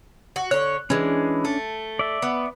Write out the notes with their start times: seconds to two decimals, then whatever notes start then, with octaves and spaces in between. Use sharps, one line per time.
0.36 F#4
0.51 D3 C#5 F#6
0.90 E3 G#3 C#4 D4
1.45 A3
1.99 D5 E5
2.22 B3